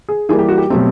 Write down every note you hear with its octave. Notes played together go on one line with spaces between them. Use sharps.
G#4
E3 G3 A#3 G#4
G4
F#4
G4
B2 F#3 A3 C4